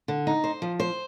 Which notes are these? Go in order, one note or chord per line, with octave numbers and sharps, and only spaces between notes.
D3
D#4
C5
F3
C5